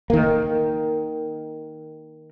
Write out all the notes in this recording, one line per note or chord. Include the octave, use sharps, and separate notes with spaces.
D#3 A#3